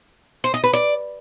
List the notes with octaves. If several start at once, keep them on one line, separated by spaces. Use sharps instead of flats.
C5
D#5
B4
D5